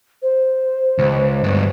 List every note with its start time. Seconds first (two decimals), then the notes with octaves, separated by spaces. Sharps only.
0.22 C5
0.99 C#2
1.44 D2 G2